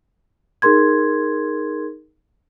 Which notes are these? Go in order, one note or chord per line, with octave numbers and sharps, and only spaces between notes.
D#4 G#4 A#4 C6 G#6